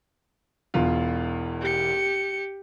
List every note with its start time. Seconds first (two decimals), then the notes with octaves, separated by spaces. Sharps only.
0.74 E1 E2 F4
1.61 G4 C#7